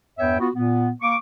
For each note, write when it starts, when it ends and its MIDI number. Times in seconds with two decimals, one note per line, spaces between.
0.19 0.37 40
0.19 0.37 43
0.19 0.37 59
0.19 0.37 73
0.19 0.37 76
0.19 0.37 79
0.40 0.48 59
0.40 0.48 65
0.40 0.48 66
0.54 0.91 46
0.54 0.91 59
1.02 1.16 58
1.02 1.16 85
1.02 1.16 86